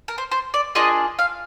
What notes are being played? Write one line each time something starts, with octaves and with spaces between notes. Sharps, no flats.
A#4
C5
C5
D5
A#3 D4 F4 G#4 D#5
F5